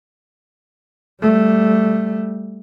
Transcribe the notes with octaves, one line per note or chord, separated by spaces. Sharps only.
G3 A3